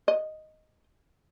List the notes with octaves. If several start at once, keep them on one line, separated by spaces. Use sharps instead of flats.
D#5